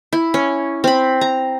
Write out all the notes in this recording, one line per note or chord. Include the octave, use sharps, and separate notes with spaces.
E4
C#4
C4 B5
A#5